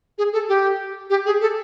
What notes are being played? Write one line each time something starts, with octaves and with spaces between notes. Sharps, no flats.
G#4
A4
G4
G4
G#4
A4